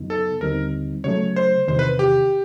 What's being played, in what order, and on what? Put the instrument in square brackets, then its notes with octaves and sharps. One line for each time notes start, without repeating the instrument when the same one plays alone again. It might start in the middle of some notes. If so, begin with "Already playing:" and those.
Already playing: [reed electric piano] F#2 C#3 F#3 B3 D#4
[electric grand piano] A4
[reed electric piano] D#2 D3 G3 C4 D#4 [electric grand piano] A#4
[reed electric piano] C#3 F#3 A3 [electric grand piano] C#5
[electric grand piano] C5
[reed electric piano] E2 C3 D#3 [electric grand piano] C5
[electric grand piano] B4
G4